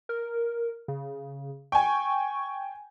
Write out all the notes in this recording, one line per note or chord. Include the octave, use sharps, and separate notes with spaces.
A#4
C#3
G5 G#5 C#6